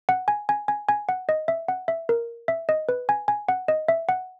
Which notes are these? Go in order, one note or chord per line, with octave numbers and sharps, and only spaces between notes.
F#5
G#5
G#5
G#5
G#5
F#5
D#5
E5
F#5
E5
A#4
E5
D#5
B4
G#5
G#5
F#5
D#5
E5
F#5